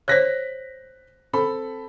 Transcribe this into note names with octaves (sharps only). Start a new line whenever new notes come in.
C5 C#5 F#6 A#6 B6
C4 A4 B5